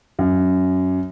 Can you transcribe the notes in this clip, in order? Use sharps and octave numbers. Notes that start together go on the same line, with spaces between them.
F#2